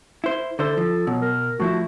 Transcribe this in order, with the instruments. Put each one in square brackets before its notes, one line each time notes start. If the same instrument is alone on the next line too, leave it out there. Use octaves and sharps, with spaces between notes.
[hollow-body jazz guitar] E4 C5
[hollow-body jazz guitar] D3 E4 C5 [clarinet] A4
[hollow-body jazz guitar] F3
[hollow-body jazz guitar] B2 [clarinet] F#3
[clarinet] A#4
[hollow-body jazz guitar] A2 F3 E4 [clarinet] F#4